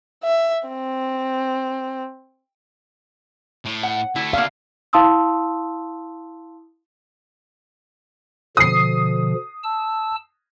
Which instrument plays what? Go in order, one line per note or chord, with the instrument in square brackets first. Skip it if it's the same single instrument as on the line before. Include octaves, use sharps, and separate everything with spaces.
[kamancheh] E5
C4
[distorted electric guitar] A2
[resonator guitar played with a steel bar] F#5
[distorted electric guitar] D2 A3 [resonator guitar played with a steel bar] E4
[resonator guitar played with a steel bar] D3 A#3 [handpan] F5
[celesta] E4 F5 A5 C6 D#6 E6
[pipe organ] B2 D3 F3 [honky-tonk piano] D#6 C7
[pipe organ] A5 E6